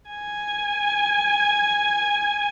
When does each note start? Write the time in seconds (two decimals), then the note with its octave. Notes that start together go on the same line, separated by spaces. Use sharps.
0.10 G#5